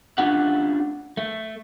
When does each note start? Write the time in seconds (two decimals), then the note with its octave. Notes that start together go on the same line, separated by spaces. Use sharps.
0.18 A3 C#4 D4 F4 G4 F#5
1.17 A3